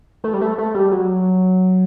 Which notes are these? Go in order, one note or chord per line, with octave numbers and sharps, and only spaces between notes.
A3
G3
A3
A3
G3
F#3